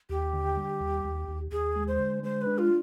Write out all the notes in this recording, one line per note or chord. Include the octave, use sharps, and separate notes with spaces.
D#2 G4
D3
G3
D#2
D#2
D#2
D#2 G#4
G#3
C5
D3
G#3 C5
B4
D4
F4